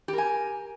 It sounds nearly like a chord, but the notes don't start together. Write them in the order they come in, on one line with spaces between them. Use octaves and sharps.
G4 A#4 G#5